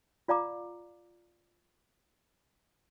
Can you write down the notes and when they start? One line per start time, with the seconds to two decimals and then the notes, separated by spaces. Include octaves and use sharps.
0.28 F4 D5 F5 A#5 D6